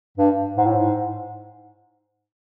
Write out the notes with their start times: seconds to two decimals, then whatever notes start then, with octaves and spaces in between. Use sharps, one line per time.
0.18 G2
0.57 G#2
0.66 A2
0.76 G#2